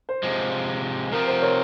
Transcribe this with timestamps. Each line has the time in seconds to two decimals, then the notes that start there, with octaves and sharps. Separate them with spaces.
0.09 C5
0.23 C3 F3 G#3
1.12 C3 F3 C4 A#4
1.27 C5
1.42 A#4 C#5